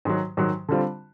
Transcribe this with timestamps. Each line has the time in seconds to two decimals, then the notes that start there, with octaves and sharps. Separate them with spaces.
0.05 G#2 D#3 F#3
0.37 G#2 D#3 F#3
0.69 D3 G3 C4 F4